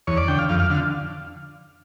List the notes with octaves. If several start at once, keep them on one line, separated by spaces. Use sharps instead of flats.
E2 C#5
D5
D3 G5
F5
F2 F5
F5
D3 F5